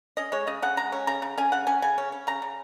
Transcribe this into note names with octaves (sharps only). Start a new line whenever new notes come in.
C#4 D#5
G#3 C#5
C#3 D#5
C#3 F#5
G#3 A#5
C#4
C#3 A#5
C#3
C#4 G#5
C#3 F#5
C#4 G#5
C#3 G#5
C#4
C#4
C#3 A#5
C#3